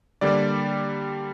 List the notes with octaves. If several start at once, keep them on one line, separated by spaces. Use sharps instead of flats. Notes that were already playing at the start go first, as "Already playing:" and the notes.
D3 G3 A#3 D5